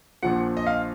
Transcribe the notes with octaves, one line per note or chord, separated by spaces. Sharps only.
A#1 A#2 F3 F#5
D#5
F5